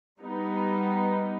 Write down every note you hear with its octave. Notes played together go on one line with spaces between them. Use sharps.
G3 B3 D#4